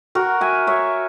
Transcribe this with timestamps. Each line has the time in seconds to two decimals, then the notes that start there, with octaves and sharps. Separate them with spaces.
0.15 F#4 A#4
0.41 E5 G#5
0.67 C#5 E5